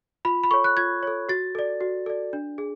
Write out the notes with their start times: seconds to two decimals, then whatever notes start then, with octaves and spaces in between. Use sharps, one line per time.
0.25 F4 B5
0.44 B5
0.51 A4 C#5 C#6
0.64 F#6
0.77 F4 G#6
1.03 A4 C#5
1.29 F#4 A6
1.55 A4 D5
1.81 F#4
2.06 A4 D5
2.33 D4
2.58 G#4